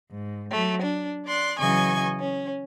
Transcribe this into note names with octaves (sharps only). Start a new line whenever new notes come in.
G#2
F#3 A3
D4
D5 C6 F#6
C#3 E3 F#3 D#5 G#5 C#6
C#4